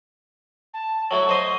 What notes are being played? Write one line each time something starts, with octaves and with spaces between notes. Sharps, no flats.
A5
F#3 A3 E4 C#6
C5 D#5 C6